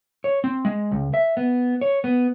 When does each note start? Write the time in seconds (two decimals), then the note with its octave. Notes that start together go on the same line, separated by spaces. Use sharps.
0.24 C#5
0.44 C4
0.65 G#3
0.91 C#2
1.14 E5
1.37 B3
1.81 C#5
2.04 B3